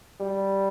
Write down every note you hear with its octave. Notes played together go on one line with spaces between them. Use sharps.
G3